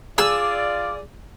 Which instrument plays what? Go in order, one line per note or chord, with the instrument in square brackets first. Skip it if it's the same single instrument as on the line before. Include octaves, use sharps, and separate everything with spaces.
[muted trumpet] F4 [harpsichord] G#4 [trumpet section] D5 [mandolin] E6